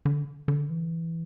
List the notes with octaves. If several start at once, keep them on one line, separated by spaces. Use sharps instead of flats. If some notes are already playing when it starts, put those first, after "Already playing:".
D3
D3
E3